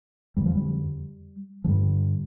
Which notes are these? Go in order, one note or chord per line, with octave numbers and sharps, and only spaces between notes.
F2 D3 G3
F3
G3
F3
G2 D3 G3